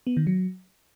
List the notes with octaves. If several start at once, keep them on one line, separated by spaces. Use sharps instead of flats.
B3
D#3
F#3